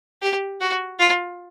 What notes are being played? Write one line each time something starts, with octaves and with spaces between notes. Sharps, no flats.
G4
F#4
F4